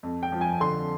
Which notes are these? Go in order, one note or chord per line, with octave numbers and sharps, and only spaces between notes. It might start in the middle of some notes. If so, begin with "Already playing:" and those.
F2
G5
F3
G#5
D3 C6